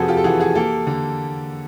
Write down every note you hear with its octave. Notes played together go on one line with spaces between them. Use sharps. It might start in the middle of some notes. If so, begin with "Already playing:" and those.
Already playing: F2 C3 F#4 G#4 A4 B4 C5
F4 G4
A4
E3 F#4 G#4
F#4 G#4
A#3 G4 A4
D3